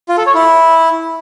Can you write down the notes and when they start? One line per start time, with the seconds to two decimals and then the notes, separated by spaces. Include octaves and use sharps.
0.09 F4
0.18 A4
0.26 C#5
0.35 E4